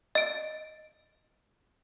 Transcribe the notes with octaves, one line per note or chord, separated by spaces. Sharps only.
D#5 D7